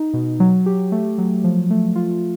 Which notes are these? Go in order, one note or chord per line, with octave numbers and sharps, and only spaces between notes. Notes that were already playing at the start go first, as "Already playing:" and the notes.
Already playing: D#4
B2
F#3
G4
A3
F#3
F3
A3
F4